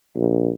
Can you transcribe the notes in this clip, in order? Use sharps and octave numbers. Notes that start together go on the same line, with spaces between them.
A#1